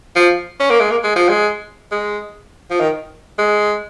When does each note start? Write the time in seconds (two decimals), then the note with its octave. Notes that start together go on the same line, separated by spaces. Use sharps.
0.16 F3
0.60 C#4
0.70 A#3
0.80 G#3
0.91 A#3
1.04 G#3
1.16 F3
1.29 G#3
1.92 G#3
2.70 F3
2.80 D#3
3.38 G#3